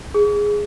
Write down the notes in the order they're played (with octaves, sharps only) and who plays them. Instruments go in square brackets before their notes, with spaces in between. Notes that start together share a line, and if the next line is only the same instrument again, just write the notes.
[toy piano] G#4